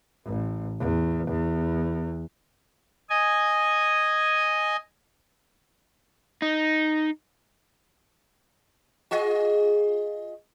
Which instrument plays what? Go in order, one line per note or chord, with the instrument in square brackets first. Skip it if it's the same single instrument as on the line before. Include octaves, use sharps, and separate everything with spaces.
[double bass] A1
E2
E2
[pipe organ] D#5 G#5
[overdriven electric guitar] D#4
[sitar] F4 G#4 D#5